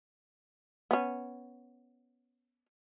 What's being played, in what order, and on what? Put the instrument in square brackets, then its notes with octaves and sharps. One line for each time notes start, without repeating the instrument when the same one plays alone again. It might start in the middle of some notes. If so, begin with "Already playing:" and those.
[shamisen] B3 C#4